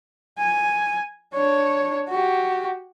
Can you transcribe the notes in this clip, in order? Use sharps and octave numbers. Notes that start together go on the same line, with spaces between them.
G#5
D4 C#5
F#4 G4